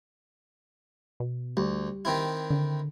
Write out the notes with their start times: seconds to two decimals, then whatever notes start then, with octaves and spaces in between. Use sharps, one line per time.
1.20 B2
1.57 D2 G3
2.05 D#3 C4 E4
2.50 D3